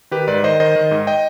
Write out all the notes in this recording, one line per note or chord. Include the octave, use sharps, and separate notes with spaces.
D#3 G4 B4
G#2 B4 D5
D#3 C5 D#5
D#3 C5 D#5
D#3
G#2
D#5 G5